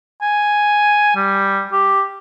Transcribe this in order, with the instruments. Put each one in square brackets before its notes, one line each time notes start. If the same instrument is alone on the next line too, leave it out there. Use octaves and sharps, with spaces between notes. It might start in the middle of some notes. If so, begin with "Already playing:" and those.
[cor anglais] G#5
G3
G4